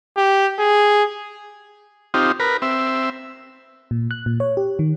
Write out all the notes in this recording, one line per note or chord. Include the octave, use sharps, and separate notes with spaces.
G4
G#4
C4 D#4 F4 G4
A#4 B4
C4 E5
A#2
F#6
A#2
C#5
G4
D#3